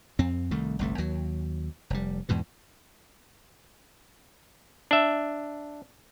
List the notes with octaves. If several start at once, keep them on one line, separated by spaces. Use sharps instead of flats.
F2 C4
C2 D#3 A3
G1 C2 A3
D#2 F#3
F1 G3
E2 G#2 B2 E3
D4 E5